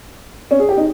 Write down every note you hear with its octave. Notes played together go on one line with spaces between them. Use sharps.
C#4
G#4
G4
D#4